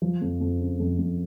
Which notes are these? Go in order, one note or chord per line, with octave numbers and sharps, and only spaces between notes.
F3
F2
F2
C#3
F2
F2